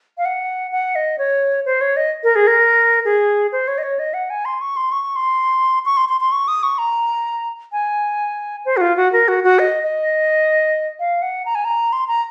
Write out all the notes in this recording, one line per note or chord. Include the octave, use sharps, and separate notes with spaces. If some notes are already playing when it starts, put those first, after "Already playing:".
F5
F#5
F#5
D#5
C#5
C5
C#5
D#5
A#4
G#4
A#4
G#4
C5
C#5
D#5
C#5
D#5
F#5
G#5
C6
C#6
C6
C#6
C6
C#6
C6
C6
C6
C#6
D#6
C#6
A#5
G#5
C5
F#4
F4
F#4
A#4
F#4
F#4
D#5
D#5
F5
F#5
A#5
G#5
A#5
C6
A#5